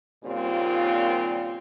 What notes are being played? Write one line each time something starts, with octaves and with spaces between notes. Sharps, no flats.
D#2 A#2 C#3 G3 C4 F4